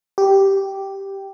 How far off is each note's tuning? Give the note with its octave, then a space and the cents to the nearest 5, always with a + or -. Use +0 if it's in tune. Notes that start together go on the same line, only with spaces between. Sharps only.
G4 -5